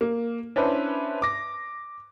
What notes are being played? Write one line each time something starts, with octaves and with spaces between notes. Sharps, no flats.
A#3
C#4 D4 E4 B4 C5
D6 A#6